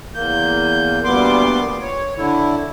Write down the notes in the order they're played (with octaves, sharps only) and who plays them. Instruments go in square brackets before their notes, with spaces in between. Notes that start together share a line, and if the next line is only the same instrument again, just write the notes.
[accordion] E2 A#3 G6
D2 A#2 G3 B3 C6 D6
C#5
D3 E4